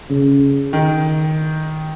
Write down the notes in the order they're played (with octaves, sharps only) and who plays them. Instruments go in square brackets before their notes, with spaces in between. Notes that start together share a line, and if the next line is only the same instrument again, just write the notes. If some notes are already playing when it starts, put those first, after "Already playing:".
[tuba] C#3
[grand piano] D#3